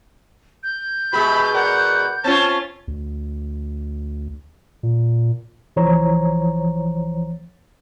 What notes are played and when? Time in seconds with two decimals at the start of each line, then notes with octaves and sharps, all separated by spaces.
0.63 G6
1.13 B2 G#3 G4 E5 B5
1.54 A#4 D5 F#5
2.24 C4 C#4 F4 A5
2.88 D2
4.83 A#2
5.76 C2 E3 F3 C5 C#5 A#5